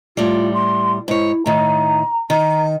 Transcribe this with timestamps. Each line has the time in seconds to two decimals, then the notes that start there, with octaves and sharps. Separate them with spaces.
0.17 A2 G3 F4
0.54 C6
1.08 G#2 E4 C#5
1.46 A2 D#3 A#5
2.30 D#3 A#5